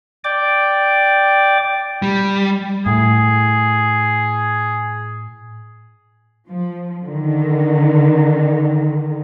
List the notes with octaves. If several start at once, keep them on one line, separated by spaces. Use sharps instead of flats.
D5 G5 D6
G3
A2 G#4
F3
D3 D#3